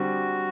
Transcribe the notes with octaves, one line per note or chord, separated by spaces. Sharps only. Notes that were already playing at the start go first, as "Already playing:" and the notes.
Already playing: D3 G3 C4 F#4